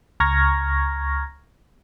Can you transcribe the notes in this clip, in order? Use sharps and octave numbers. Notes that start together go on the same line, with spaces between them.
C#2 A#5 C#6 F6 G#6 A#6